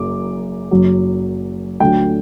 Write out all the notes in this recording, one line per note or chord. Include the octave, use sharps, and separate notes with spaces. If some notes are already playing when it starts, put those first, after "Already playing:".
Already playing: F#1 F#2 F#3 D6
F#1 F#2 F#3
D2 D3 F#3 G5